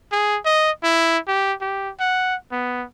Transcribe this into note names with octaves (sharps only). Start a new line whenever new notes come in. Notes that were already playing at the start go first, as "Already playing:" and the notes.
G#4
D#5
E4
G4
G4
F#5
B3